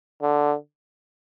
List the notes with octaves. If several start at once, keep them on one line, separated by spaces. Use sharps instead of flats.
D3